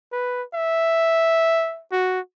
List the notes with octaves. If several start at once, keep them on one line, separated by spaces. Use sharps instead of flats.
B4
E5
F#4